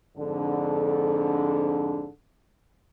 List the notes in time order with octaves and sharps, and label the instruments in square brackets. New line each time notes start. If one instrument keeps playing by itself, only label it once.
[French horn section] F2 G#2 D3